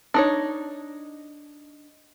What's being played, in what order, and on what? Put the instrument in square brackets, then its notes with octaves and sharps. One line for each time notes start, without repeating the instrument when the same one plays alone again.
[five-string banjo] D4 D#4 C#5